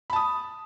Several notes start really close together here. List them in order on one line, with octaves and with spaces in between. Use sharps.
B5 A5 D#6